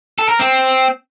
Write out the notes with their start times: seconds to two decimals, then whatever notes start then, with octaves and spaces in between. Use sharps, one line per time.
0.19 A4
0.29 A#4
0.39 C4